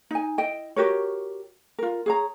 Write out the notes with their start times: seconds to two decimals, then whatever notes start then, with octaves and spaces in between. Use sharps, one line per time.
0.11 D#4 G#5
0.38 E4 D#5 G5
0.76 F#4 G4 A#4 C#5
1.79 F4 A#4
2.06 G#4 C#5 A#5